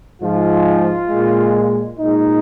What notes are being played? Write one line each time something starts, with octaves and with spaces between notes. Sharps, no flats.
G#2 F3 G#3 F4
A#2 G#3
A#2 G#3 D#4